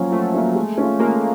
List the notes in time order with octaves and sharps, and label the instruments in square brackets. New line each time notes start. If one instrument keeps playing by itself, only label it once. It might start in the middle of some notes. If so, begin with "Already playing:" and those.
Already playing: [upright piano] F3 A#3 C#4 [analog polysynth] F#3
[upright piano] F3 [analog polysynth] A3
[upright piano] A#3 C#4
G#3
C#4 F4
[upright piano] G#3 [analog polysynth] A#3